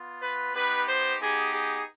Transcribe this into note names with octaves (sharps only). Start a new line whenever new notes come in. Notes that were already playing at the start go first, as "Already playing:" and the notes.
Already playing: B3 F4
B4
B3 D#4 G4 B4
C5
B3 D#4 G4 G#4
G#4